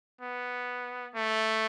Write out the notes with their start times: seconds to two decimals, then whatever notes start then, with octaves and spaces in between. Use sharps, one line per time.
0.21 B3
1.16 A3